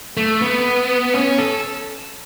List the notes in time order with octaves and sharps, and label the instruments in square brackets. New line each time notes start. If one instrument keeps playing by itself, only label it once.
[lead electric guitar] A3
B3
C#4
A4